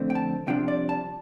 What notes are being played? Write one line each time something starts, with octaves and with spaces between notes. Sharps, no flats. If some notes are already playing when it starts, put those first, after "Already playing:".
Already playing: F2 D3 A3 C4
G5
A5
C2 C3 F3 D4 G5
D5
A5